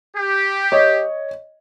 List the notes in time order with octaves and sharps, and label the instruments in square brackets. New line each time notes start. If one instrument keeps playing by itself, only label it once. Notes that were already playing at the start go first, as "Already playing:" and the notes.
[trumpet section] G4
[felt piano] C#5 D#5